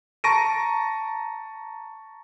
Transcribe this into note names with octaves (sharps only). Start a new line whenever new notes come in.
A5 A#5 C#6 A#6 D7 D#7